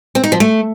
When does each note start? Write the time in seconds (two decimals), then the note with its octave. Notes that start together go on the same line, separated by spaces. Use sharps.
0.15 C4
0.24 D#4
0.32 F3
0.40 A3